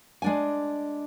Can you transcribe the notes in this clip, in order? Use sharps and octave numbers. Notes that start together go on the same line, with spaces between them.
G#3 D4 G#5